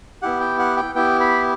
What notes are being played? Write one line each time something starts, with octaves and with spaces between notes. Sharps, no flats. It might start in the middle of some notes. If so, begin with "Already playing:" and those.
B3 E4 G4 F#5
G5
F#5
G5
B3 E4 G4 G5
B5